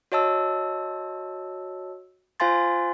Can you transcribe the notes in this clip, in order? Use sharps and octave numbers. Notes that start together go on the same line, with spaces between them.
F#4 C#5 D#5 A5 E6
F4 C5 F5 G#5 C6 A6